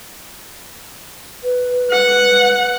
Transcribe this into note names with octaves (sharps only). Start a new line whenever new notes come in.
B4
F#5